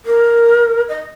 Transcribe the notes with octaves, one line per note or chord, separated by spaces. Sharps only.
A#4
D#5